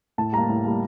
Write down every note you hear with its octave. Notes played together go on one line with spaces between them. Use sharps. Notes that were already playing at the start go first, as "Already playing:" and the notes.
A2 A5
G3 A#3 A#5
A2
G3 A#3